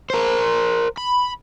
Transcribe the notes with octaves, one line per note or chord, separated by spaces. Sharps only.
A#4 C5
B5